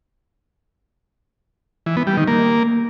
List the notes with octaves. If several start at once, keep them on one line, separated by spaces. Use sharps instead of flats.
E3
B3
G3
D#3
A#3